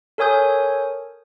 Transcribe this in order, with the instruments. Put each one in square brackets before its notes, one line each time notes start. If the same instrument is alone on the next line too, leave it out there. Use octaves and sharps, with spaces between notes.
[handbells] A4 A#4 C#5 G#5 D#6 G6